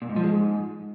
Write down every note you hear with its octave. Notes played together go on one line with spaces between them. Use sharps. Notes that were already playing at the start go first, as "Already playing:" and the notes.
A#2
G#2
F3
G#3
G#2